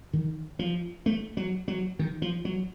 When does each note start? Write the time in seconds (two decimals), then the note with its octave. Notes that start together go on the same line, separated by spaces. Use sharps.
0.13 D#3
0.59 F3
1.06 A3
1.37 F#3
1.68 F#3
1.99 D#3
2.22 F3
2.45 F#3